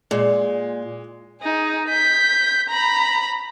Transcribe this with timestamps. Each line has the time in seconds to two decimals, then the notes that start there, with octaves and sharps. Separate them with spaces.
0.11 A#2 G#3
1.42 D#4 G#4
1.88 G6 B6
2.69 A#5 B5